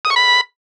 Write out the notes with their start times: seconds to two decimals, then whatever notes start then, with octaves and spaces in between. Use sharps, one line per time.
0.05 D#6
0.10 C#6
0.16 B5